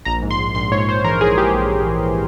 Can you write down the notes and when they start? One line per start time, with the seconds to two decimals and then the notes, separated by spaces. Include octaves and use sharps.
0.05 A#1 A#5
0.23 G#2
0.31 C6
0.38 A#1
0.55 A#1 C6
0.72 G#2 C#5
0.88 G#2 C5
1.04 E3 A#4
1.21 A#1 G#4
1.37 A#1 G4
1.54 A#1
1.71 A#1
1.87 E3